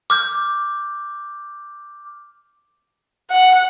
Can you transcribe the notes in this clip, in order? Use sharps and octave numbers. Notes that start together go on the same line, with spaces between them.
D6 F6 G6
F#5